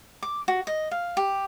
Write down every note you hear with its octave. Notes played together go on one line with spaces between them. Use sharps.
D6
F#4
D#5
F5
G4